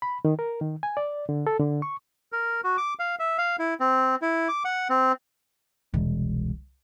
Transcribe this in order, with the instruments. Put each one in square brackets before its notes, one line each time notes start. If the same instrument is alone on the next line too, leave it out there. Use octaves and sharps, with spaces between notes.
[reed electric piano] B5
D#3
A#4
D#3
G#5
D5
D3
A4
D3
C#6
[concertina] A#4
F#4
D6
F5
E5
F5
E4
C4
E4
D6
F#5
C4
[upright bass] E1 C2